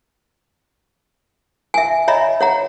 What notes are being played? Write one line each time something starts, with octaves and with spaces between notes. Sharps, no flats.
E5 G#5
C#5 D#5 E5 A#5 B5
C#5 F#5 A#5